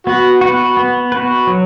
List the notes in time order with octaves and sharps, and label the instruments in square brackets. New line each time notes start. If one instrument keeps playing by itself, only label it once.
[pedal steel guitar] B3 [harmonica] F#4
[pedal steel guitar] F#4 B4
B3
F#4 B4
F#3